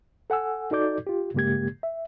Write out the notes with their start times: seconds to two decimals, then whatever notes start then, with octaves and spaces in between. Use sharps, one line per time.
0.30 A4 F#5 G#5 E6
0.71 D#4 F#4 A4 D5 D6 G6
1.07 F4 G4
1.34 G2 C#3 G#3 A#3 G4 G#6
1.83 E5